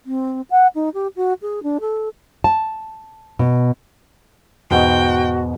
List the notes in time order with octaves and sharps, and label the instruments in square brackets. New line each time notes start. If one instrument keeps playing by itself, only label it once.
[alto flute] C4
F#5
D#4
G4
F#4
G#4
D4
A4
[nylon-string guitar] A5
B2
[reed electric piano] E2 B3 [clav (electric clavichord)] G#2 B2 G#3 [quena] F#4 [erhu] G5